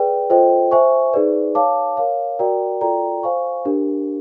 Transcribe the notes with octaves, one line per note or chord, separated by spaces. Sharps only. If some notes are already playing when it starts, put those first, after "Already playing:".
Already playing: G#4 B4 D5 G5
F4 A4 C5 D#5 G5
C5 E5 G#5 C#6
D#4 G#4 B4 D5
C#5 F5 A5 D6
A#4 C#5 F5
F#4 A#4 D5 G5 A#5
F4 A4 D5 G5 A#5
C5 F5 G#5 C#6
D4 G4 A#4